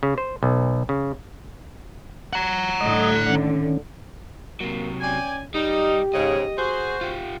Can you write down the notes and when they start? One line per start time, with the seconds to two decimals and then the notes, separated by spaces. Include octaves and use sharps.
0.03 C#3
0.18 C5
0.43 B1
0.89 C#3
2.33 F#5 A#5
2.81 A2 D3 D#5 D#6
3.29 D#3 C#4
4.61 C3 F#3 A#3
5.01 C#4 D5 G5 G#5
5.54 G3 D#4 G4
6.14 G#2 C#3 D#5
6.58 F#4 G#4 C5
7.01 F4 G4